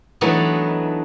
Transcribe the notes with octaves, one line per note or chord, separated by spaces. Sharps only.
E3 F#3 A3 B3 D4 D#4